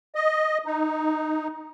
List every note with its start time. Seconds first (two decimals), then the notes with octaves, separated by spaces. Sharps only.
0.15 D#5
0.66 D#4